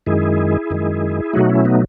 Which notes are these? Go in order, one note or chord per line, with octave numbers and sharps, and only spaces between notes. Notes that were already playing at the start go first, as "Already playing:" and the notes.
F#2 D#3 G#3 E4 G#4
F#2 D#3 G#3
B2 F#3 A3 D#4 F#4
C#4 E4
B3 D#4